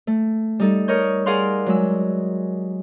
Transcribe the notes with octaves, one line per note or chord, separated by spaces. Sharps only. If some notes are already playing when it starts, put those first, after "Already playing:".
A3
G3 D#4 A4
A#4 C#5 D#5 C#6 G6
G#4 A#4 D5 F5 F#5 C6
F#3 G#3 E6